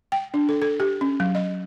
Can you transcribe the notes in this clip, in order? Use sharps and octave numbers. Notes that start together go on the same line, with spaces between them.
G5
D4
A4
A4
G4
C#4
F#3
D#5